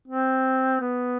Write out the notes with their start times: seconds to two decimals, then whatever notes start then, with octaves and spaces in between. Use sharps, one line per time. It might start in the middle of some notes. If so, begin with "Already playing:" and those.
0.08 C4
0.80 B3